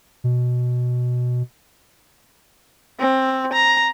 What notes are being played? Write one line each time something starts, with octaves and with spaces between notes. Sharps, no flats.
B2
C4
A#5